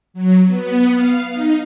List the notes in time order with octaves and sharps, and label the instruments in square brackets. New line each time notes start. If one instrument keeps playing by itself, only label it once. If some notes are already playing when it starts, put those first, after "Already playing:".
[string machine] F#3
B3
F5
D#4